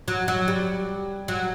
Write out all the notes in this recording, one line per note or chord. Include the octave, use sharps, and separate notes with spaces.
F#3
F#3
G3
F#3